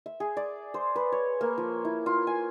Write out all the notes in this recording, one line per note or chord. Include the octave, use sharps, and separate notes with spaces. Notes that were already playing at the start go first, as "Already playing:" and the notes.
E5
G#4
D5
C5
B4
C#5
A#3
F3
E4
F4
G#5